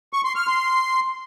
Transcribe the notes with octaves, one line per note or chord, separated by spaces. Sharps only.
C#6
C6
F6
C6